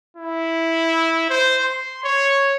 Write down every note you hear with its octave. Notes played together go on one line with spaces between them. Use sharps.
E4
C5
C6
C#5